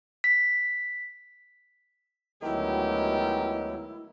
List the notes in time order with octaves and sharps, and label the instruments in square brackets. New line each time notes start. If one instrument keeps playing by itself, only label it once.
[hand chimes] B6
[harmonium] D2 F#3 [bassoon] D#3 [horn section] G#3 B3 G4 [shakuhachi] E4